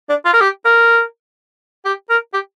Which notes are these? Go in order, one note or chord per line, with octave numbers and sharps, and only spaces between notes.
D4
F4
A#4
G4
A#4
G4
A#4
G4